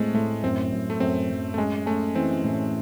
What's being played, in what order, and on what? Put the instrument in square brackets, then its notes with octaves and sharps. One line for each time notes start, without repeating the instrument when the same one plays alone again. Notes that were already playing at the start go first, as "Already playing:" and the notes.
Already playing: [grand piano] A2 C4 [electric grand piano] G#3 A3
[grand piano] A2 [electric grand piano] A3
[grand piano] F#2 [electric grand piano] C4
[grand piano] F#2
[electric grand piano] A3
[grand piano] F#2 [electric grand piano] C4
[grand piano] F#2
[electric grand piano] A3
[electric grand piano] G#3 [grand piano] C#4
[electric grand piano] A3 [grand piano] C#4
[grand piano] E3 [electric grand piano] C4
[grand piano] A2